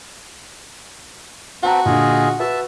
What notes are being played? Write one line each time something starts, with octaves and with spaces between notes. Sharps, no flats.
C4 F#4 B4 F#5 A5 A#5
A#2 D3 F4 G#4 D#5
F#4 B4 E5 A5